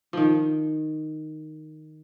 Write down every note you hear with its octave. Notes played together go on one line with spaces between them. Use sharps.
D#3 F3